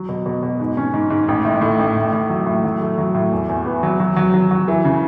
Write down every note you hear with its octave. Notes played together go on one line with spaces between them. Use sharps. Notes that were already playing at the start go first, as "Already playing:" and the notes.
Already playing: F#3
B2
B2
B2
G#2
C#4
G#2
G#2
A1
A2
A2
A1
A2
A2
F#3
A2
F#3
A3
F#3
A2
E2
E2
B3
F#3
F#3
F#3
F#3
F#3
E3
C#3